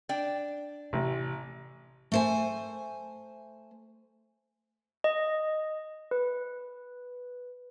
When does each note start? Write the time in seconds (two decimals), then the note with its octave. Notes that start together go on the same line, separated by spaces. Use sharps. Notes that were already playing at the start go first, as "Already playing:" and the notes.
0.09 D4 D5 G5
0.93 A1 C3
2.12 A3 C5 G#5
5.04 D#5
6.11 B4